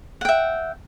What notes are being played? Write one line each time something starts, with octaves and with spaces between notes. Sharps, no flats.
E5 F#5 G5